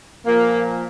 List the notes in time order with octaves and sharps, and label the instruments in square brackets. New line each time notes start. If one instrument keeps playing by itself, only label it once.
[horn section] A#2 F3 A#3